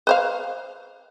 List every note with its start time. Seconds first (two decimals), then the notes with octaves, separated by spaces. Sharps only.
0.07 B4 C5 F5